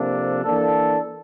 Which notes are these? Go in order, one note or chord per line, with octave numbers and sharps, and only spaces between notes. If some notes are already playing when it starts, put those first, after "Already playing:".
Already playing: C3 F3 A#3 D4 A4
E3 A#3 D4 A4